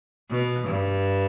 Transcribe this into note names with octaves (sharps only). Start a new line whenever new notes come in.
B2
G2